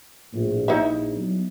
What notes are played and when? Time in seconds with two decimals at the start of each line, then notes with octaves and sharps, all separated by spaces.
0.32 A#1 A2
0.68 A#1 D#4 E4 E5
1.16 F#3 B3